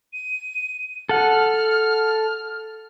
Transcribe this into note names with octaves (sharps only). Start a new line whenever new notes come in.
D#7
A4 F#5 F6